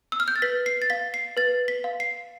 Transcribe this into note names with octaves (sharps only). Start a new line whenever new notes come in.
E6
F6
G6
A6
B4 B6
C7
A6
F5 B6
C7
B4 A6
B6
F5
C7